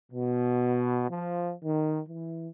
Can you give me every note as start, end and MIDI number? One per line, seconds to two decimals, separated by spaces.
0.12 1.06 47
1.10 1.54 53
1.63 2.01 51
2.08 2.48 52